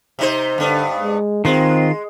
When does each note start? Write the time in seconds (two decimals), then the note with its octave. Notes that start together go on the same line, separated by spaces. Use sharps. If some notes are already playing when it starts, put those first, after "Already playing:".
0.19 C3 D#4 C5
0.58 G2 D3 B3
1.00 G#3
1.45 D#3 G#3 C4 F4